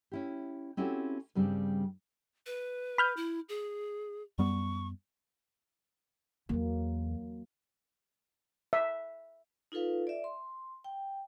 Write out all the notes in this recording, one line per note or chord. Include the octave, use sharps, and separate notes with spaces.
C#4 E4 G4
C4 C#4 E4 F#4 G4 A4
G2 C#3 G3 C4 D4
B4
B5 F6 G6
E4
G#4
F#2 G3 B3 C#6
E2 F#3 A#3
E5
D#4 F4 A4 B4 F5
D5 E5
C6
G5